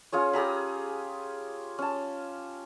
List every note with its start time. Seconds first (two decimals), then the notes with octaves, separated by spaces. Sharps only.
0.13 C#4 F4 G#4 C#5
0.33 G4 G#4 A#5 B5
1.79 C#4 A5